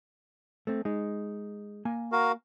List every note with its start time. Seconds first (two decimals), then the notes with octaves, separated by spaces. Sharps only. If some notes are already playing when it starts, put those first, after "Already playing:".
0.67 A3 C4
0.85 G#3 D#4
1.85 A#3 G#5
2.12 F#4 A#4 F5